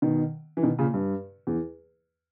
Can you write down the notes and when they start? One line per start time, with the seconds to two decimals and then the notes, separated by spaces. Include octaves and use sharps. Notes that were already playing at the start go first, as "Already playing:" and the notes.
0.02 B2 D#3
0.57 E3
0.63 B2 D#3
0.79 A#2 C#3
0.94 G2
1.47 E2